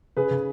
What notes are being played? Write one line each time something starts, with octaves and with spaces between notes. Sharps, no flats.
C#3 G#4 B4
C#3